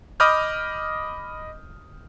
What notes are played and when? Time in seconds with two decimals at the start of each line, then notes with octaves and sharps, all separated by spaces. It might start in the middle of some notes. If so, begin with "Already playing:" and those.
0.20 D#5 B5 D6 D#6 F6 G6